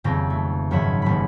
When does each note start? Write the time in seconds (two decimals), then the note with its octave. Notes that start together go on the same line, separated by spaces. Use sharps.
0.04 D#1 F2 C#3 C4 A#6
0.30 A3
0.71 G#1 F#2 F3 C#5 E5 B5
1.02 D#1 B5